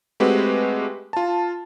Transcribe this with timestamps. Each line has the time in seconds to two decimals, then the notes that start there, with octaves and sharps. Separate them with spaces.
0.20 G#3 A3 C4 F#4 G4 B4
1.13 F4 A5